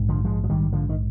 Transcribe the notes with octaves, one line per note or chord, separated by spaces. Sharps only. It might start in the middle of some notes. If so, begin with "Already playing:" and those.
Already playing: A#1 G#2
D3 F3
F3 G#3
F3
D#3 G3
D3 F3
D#3